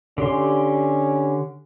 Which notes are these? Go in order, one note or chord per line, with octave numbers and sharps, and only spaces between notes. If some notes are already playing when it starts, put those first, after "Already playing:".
D3 C#4 G4 C6